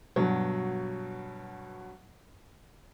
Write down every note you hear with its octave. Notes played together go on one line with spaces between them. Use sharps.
G2 B2 F#3